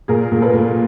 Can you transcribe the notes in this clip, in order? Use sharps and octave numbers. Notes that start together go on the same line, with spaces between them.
A#2 G#4 A#4
A#2
A4 B4
A#2